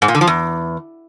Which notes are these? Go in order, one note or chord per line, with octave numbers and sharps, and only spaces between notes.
G#2
A#2
D3
F3
E2